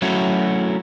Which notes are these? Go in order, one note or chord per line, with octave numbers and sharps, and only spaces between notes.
F#3 A3 C#4 E4 F#4